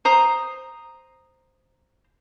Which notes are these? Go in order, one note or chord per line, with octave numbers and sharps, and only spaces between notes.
C5 A#5 D#6